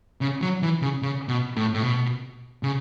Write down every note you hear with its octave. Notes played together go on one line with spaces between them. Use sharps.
C#3
F#3
E3
C#3
C#3
B2
A2
A2
B2
C#3